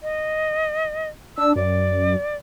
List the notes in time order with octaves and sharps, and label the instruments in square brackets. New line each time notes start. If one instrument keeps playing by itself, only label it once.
[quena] D#5
[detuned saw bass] D4 [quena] E6
[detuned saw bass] F#2 [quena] D5